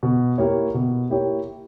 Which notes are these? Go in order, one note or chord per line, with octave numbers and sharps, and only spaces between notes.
B2
A#3 E4 G4 C#5
B2
A#3 E4 G4 C#5